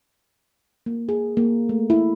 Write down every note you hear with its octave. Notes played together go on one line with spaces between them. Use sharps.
A#3
G#4
A#3
A3
E4